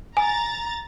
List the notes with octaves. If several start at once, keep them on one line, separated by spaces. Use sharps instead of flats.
G#5 A#5 A6